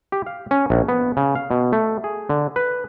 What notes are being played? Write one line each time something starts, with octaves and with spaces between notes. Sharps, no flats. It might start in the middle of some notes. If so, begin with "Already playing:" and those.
G4
F5
C#4
A#1
B3
C#3
F5
B2
A3
G#4
D3
B4